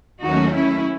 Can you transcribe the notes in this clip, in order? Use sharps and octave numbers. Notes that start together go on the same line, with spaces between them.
D#2 D#3 F#3 A3 C#4 D#4 F#4
C#4 E4